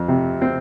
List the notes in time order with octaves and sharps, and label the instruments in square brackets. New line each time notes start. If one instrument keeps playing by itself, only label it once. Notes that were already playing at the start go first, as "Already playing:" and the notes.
Already playing: [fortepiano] F2
C3
C4